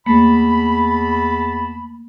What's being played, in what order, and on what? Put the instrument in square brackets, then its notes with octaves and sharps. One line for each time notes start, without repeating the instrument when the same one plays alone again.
[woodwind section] E2 A5 B5 [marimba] A3 A#3